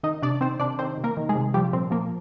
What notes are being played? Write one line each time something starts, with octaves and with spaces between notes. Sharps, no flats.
D#3 D#4 D#5
C3 D4 D5
D#3 C4 C5
C3 D4 D5
D#3 C4 C5
C3
A#3 A#4
D#3
G#3 G#4
C3
F3 G3 G4
A#2 C4
F3 A#3